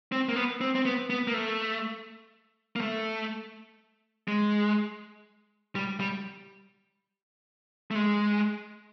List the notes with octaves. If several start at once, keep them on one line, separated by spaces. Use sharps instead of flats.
C4
A#3
B3
C4
C4
B3
B3
A#3
A3
A#3
A3
G#3
G3
G3
A3
G#3